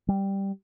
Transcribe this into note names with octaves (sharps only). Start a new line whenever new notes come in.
G3